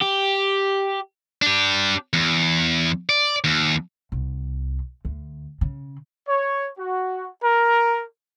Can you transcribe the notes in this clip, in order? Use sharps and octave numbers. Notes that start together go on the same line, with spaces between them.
G4
D4 G4
E2
D5
D#2
C2
D2
C#3
C#5
F#4
A#4